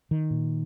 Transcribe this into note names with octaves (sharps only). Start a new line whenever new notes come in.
D#3
A#2